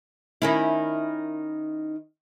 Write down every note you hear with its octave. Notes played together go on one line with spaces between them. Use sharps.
D#3 C#4 E4